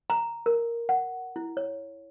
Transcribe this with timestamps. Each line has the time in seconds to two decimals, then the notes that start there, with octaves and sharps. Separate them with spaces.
0.10 A#5
0.46 A#4
0.89 F#5
1.36 E4
1.57 C#5